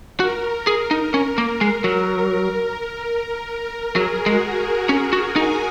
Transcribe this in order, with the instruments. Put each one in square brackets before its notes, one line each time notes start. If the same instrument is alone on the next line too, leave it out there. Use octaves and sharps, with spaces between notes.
[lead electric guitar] F#4 [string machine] A#4
[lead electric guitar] G#4
D#4
C#4
A#3
G#3
F#3
[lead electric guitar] F#3 [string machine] G#4
[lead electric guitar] G#3 [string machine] F#4
[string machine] G#4
[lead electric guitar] C#4 [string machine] A#4
[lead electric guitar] F#4
[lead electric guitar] D#4 [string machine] G#5